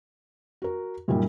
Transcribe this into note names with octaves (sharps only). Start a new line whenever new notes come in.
F#4 A#4
F#2 A#2 D#3 G3